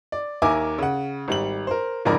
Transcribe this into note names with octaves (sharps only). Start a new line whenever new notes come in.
D5
D#2 A#4 E5 G#5 D6
C#3 F#5
G#1 G3 F#7
A#4 C5
F1 F2 G#2 C#3 A#4 D5